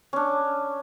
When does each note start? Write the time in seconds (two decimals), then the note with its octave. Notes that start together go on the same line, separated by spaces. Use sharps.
0.13 C#4 D4